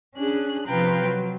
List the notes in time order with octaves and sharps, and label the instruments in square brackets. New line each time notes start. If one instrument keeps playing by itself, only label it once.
[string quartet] C#4 D4 G#4 F#6
C3 F3 F4 B4 G5 A#5
F#3